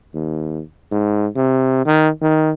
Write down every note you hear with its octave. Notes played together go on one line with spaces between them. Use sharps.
D#2
G#2
C3
D#3
D#3